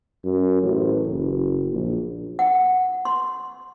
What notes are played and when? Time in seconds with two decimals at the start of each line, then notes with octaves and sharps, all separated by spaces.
0.24 F#2
0.62 A1
1.07 F#1
1.72 A#1
2.39 F#5
3.05 C6